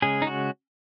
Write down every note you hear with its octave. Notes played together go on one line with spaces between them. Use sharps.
C#3 G#3 C#4 G#4
D#4
F#4